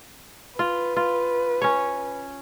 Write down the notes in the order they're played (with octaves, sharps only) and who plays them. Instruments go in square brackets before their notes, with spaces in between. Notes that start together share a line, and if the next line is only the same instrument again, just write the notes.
[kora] F4 [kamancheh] B4
[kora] F4
C#4 C#5